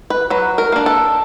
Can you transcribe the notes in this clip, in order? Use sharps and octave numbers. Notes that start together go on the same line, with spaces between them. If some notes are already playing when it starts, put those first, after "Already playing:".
B4
F#3 B4
A#4
A#3 D4
A4